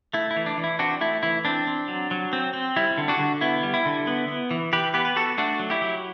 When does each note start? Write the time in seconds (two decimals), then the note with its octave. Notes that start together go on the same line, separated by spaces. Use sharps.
0.14 A3 E4
0.31 E4
0.36 E3
0.46 D4
0.57 E3
0.64 E4
0.79 C4 D4 F#4
1.01 A3 E4
1.23 E3 E4
1.45 C4 D4
1.67 C4
1.88 F#3
2.11 F#3
2.33 C4
2.53 C4
2.76 G3 E4
2.98 D3
3.08 D4 F#4
3.19 D3
3.41 B3 E4
3.63 G3
3.74 E4
3.86 D3
4.07 B3
4.28 B3
4.51 E3
4.73 E3 G4 B4
4.94 B3 G4 B4
5.05 B4
5.16 B3 F#4 A4
5.38 A3 D4 F#4
5.59 F#3
5.70 E4 G4
5.82 F#3